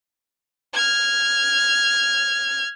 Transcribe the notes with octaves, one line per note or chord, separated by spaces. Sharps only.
F6 G#6